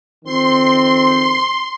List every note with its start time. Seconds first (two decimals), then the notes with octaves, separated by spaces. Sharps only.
0.24 F2 D#3 C4 C6